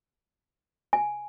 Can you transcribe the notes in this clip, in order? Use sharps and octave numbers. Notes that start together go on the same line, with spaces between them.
G#5